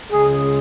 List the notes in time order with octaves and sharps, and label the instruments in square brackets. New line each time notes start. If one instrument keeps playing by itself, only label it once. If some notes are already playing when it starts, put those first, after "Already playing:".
[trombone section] C#2 C#3 G#3 G#4